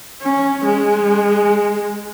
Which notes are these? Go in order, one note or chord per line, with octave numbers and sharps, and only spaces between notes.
C#4
G#3